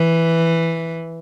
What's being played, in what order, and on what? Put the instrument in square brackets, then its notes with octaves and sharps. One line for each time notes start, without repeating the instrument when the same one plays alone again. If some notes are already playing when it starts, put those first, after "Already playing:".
Already playing: [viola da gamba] E3